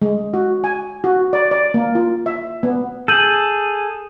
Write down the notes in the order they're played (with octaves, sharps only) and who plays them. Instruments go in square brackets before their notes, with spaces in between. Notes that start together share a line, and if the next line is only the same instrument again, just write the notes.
[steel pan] G#3
F#4
G#5
F#4
D5
D5
A#3
F4
E5
B3
[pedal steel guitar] G#4 A4 [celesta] G6 D#7 F#7